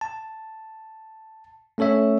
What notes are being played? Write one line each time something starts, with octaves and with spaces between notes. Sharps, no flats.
A5
A3 C#4 A4 C#5 E5